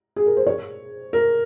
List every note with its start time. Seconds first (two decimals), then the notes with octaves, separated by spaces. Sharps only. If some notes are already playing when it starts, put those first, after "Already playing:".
0.16 G#4
0.26 A#4
0.37 C5
0.47 C#5
1.13 A#4